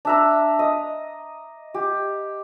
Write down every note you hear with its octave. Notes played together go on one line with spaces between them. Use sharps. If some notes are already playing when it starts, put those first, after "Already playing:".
D4 E5 A#5
D#5
G4